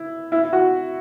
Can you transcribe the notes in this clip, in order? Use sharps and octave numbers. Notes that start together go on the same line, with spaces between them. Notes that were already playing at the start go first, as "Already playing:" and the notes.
Already playing: E4
E4
E4
F#4